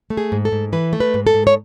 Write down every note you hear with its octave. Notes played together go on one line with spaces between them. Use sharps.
A3
G#4
G#2
A4
G#2
E3 B4
A3
B4
G#2
A4
G#2
C#5